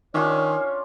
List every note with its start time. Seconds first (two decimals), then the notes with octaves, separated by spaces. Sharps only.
0.14 D#3 C#4 D4 F4 C#5